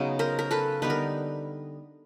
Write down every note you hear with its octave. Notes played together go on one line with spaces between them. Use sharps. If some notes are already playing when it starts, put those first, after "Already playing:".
Already playing: C#3 F#3 B3 D#4
A#4 C5
A#4
A4 B4
D3 G3 B3 D#4 B4
A#4